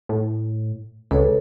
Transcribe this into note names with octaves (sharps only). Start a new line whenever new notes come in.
A2
C#2 A4 B4 C#5